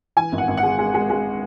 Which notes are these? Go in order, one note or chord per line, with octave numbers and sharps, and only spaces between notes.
E3 G#5
G#1
F#5
G#1
F#5
G#3
G#3
G#3
G#3